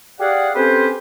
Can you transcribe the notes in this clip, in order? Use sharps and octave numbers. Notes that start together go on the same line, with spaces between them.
G4 G#4 D5 F5 F#5
C4 C#4 G4 A4 B4 C5